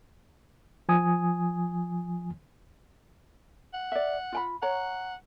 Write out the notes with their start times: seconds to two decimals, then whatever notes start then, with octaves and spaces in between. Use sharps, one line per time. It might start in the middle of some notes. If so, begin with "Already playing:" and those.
0.89 F3 G#5 D#6
3.74 F#5
3.92 D5 E5
4.32 F4 G5 B5
4.62 C#5 F#5 A#5